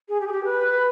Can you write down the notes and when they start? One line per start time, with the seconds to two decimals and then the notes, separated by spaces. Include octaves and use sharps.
0.09 G#4
0.21 G4
0.27 G#4
0.32 G4
0.44 B4